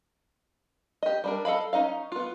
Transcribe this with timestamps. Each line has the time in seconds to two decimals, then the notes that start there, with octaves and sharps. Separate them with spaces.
1.03 G4 D#5
1.24 G3 D4 A#4
1.45 A4 D#5 F5 B5
1.73 C#4 D#4 D#5 F5
2.12 B3 F4